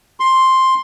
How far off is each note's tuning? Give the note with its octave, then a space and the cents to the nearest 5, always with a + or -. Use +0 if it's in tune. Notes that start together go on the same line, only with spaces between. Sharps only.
C6 +5